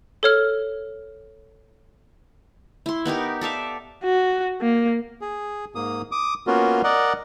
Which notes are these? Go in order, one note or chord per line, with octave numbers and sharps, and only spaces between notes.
A4 C#5 F6
E4 C6
B3 D#4 G4 A#4
A4 D5 E5 F5
F#4
A#3
G#4
G#2 A#3 D#6
D6 D#6
A#3 B3 C#4 F4 F#4 A#4
A#4 D5 D#5 F#5